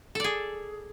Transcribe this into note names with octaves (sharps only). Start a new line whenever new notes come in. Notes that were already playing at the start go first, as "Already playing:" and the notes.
G#4 A4 D5